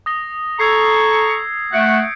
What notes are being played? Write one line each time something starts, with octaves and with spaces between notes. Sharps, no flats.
D#6 A#6 G7
A4 A#5 C#6 E6 G#6 C7
A3 F#5 G6 C#7 D7